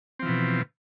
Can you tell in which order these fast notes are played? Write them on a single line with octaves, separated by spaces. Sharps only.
C4 F3 E3 B2